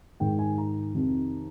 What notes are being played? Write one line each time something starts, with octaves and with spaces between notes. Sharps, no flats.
G#2 D#3 G5
G#5
A#5
F2 C3 D#3